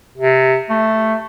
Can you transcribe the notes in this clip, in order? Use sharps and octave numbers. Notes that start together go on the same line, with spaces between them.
C3
A3